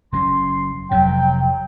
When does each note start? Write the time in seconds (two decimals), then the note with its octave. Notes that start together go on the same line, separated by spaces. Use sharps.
0.12 F#1 F#3 C#4 C6
0.91 F1 F2 C3 F#3 G5